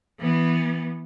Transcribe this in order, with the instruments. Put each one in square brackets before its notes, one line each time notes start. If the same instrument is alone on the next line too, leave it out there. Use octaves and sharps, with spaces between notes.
[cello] E3 B3